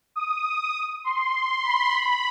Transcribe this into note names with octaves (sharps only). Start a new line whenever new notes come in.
D#6
C6
B5
B5